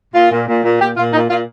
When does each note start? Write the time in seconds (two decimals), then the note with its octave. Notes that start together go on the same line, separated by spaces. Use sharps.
0.14 A#2 F4
0.32 A#2
0.48 A#2
0.64 A#2
0.81 A#2 G4
0.97 A#2 F4
1.13 A#2 D#4
1.30 A#2 F4